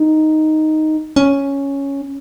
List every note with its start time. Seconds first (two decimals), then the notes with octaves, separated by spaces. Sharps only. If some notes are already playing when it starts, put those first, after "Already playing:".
Already playing: D#4
1.16 C#4